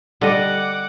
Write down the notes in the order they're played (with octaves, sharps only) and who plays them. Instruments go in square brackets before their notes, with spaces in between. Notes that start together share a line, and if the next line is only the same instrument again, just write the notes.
[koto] D3 [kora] G3 D#5 [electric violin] F#5 D6